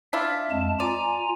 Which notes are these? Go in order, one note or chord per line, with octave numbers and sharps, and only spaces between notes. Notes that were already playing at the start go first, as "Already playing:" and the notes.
D4 E4 F4 E5
F2 G#3 A5
F4 D5 G#5 A#5